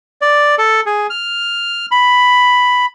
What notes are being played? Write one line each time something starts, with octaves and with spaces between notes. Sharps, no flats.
D5
A4
G#4
F6
B5